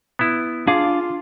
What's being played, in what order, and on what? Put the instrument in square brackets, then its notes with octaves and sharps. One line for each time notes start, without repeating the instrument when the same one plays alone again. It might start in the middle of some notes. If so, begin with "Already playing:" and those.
[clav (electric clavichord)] B3 E4
[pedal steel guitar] D4 F5 D6 [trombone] F4 [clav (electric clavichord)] G#4